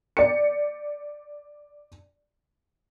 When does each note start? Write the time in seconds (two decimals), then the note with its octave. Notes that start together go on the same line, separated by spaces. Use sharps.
0.17 D5 C#7